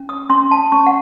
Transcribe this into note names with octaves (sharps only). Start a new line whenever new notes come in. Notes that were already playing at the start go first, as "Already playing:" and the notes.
Already playing: C#4
D#6
C#4 C6
A5
C#4 C#6
F#5